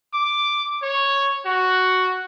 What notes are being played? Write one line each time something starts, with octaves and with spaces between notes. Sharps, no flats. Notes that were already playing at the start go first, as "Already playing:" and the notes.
D6
C#5
F#4